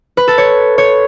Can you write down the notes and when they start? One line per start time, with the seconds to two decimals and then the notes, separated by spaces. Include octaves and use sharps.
0.17 B4
0.28 A4
0.38 C#5
0.78 C#5